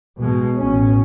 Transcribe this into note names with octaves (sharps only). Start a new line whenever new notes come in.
B2 G#3
A1 B2 C#4